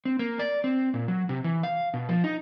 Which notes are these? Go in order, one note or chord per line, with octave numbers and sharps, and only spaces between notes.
C4
A#3
D5
C4
A#2
F#3
C3
E3
F5
B2
F3
D#4